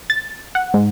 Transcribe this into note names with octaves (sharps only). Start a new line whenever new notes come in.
A6
F#5
G#2